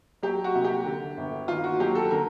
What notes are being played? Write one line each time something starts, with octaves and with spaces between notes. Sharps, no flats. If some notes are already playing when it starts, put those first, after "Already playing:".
F#3 G4
F#4
C2
G4
D3
G1
D#3 F4
F#4
F#3 G4
A4
D3 A#4